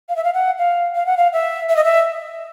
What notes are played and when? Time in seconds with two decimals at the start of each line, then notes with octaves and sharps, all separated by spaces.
0.09 F5
0.16 E5
0.24 F5
0.34 F#5
0.58 F5
0.95 F5
1.06 F#5
1.17 F5
1.33 E5
1.69 E5
1.76 D#5
1.84 E5